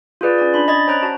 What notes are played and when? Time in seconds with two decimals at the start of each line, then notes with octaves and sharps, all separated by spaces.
0.21 F4 G#4 B4 D5
0.38 C#4 D5
0.53 D4 B5 C6
0.68 D5 D#5 B5 G#6 A6
0.87 C#4 C5 C#5 A#5 F#6 D7
1.02 F#4 A5 C#6